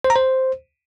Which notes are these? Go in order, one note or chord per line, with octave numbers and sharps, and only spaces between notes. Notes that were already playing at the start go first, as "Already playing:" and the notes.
C5
A#5
C5